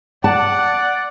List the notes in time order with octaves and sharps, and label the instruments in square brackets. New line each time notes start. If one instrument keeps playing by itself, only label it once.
[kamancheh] D5 [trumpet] F#5 [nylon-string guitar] A5